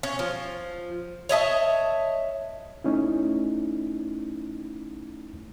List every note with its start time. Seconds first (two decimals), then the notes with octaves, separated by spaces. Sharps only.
0.03 C#4
0.19 F3
1.29 C#5 D#5 E5 A5
2.84 A3 C#4 D#4 E4